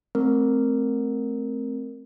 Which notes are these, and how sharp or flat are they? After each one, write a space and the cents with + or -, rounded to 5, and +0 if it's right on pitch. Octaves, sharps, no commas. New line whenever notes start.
A3 -10 C4 +0 A#4 -10